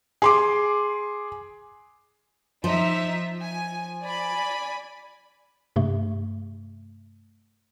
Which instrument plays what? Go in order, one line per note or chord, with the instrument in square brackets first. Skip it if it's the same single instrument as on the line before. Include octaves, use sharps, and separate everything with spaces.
[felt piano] G#4 C6 D6
[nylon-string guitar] F3 [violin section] D#4 E5
[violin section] G#5
D5 G#5 B5
[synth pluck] G2 C3 A3